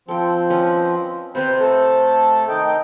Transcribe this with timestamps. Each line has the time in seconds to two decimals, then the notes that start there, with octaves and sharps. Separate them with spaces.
0.08 F3 C4 A4 G5
0.50 C#4 B4 D#5
1.35 C3 C4 B4 C5 D#5
1.60 A3 A4
2.49 D#3 D#4 G5